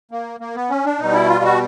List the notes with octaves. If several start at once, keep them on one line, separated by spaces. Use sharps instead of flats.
A#3
A#3
B3
C#4
D4
B2 G3 D#4
E4
F4
F#4